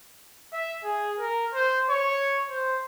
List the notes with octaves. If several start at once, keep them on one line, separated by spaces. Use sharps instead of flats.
E5
G#4
A#4
C5
C#5
C5